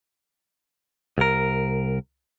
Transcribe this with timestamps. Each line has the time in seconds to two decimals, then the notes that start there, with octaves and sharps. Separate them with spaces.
1.18 C2 A#4